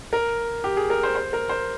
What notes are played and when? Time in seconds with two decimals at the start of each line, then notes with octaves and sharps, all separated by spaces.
0.13 A#4
0.64 G4
0.77 G#4
0.90 A#4
1.03 C5
1.15 C5
1.33 A#4
1.49 C5